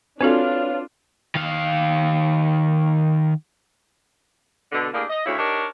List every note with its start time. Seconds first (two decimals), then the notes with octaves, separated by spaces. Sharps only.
0.21 C4 D4 F4 F#4 A4 B4 C#5 F5
1.35 D#3 F5
4.72 B2 D3
4.93 A2 A#3 D4 G4 G#4
5.10 D#5
5.25 D2 C#3 E4 C#5
5.38 D4 D#4 G4 A#4 C#5